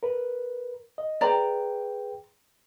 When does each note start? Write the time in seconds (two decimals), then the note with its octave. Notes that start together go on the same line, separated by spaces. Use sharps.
0.03 A#4 B4
0.98 D#5
1.21 G#4 B4 D5 G5 A#5